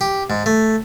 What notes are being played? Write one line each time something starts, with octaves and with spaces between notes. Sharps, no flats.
G4
G#2
A3